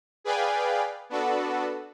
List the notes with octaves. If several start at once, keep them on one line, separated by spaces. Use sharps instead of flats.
G#4 B4 D5 F5 G5 G#5
B3 D4 F#4 A4 B4